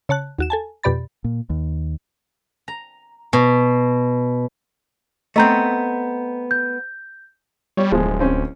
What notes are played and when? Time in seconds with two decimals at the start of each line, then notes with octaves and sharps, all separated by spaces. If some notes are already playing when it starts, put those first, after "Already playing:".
0.09 C#3 C#5 A5 F#6
0.39 D#2 F#4 E7
0.50 A4 G#5 A5
0.83 F2 B2 G4 D5 B5 A6
1.24 A#2
1.50 D#2
2.68 A#5
3.33 B2
5.36 A3 B3 C4 D#5 A#5 G6
6.51 G6
7.77 G3 C#5
7.92 D1 F3 G#3
8.20 C4 C#4